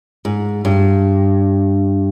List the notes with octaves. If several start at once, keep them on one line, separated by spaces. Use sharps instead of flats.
G#2
G2